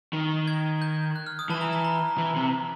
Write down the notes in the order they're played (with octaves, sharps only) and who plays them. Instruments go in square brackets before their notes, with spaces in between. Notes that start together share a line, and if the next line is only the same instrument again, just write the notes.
[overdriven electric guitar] D#3
[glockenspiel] G#6
G6
F#6
F6
D#6
[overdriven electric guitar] E3 [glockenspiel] A5
[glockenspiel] A#5
A#5
A#5
[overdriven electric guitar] E3
C3